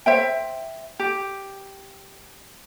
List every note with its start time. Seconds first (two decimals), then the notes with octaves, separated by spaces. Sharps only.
0.06 C5 E5 G5
0.99 G4